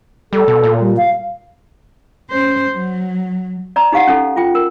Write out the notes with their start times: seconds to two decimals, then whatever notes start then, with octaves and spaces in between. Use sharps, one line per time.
0.33 G3 A4
0.48 B2
0.63 A#2
0.80 G3
0.97 F5
2.30 C#4 C5
2.71 F#3
3.76 D5 A#5
3.92 D#4 G4 F5 F#5
4.07 C#4 D#4 A4
4.36 F4 G5
4.55 A#4